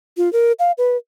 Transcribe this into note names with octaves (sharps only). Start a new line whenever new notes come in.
F4
A#4
F5
B4